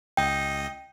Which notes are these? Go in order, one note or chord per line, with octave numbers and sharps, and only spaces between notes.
C#2 D#5 G5